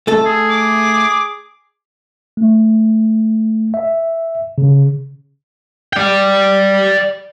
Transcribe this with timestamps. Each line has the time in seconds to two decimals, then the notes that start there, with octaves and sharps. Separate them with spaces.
0.07 A3 A4
0.26 G#4
0.50 D6
2.37 A3
3.74 E5
4.58 C#3
5.93 D5 G5